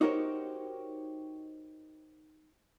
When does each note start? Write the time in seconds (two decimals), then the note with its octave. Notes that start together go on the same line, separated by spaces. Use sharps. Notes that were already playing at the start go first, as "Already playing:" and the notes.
0.01 D#4 F#4 G4 A#4 C5 C#5